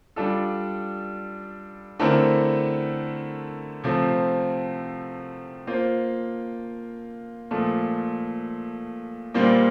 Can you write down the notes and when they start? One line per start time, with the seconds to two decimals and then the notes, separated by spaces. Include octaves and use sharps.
0.16 G3 D4 F4 A4
1.99 D3 A3 C4 E4 A#4
3.84 C3 F3 A3 C4
5.67 A#3 F4 C5
7.51 A#2 F3 A3
9.34 A#2 G3 A#3 F4 C5